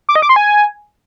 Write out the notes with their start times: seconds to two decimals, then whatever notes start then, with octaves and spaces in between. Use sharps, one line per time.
0.09 D6
0.16 D#5
0.22 D6
0.29 C6
0.36 G#5